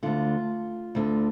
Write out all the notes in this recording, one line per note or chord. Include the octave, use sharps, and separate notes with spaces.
D2 D3 F4
D2 D3